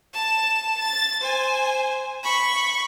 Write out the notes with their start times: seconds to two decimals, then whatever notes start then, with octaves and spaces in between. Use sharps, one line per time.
0.14 A5 E7
0.79 A6
1.20 C5 G#5
2.23 B5 C#6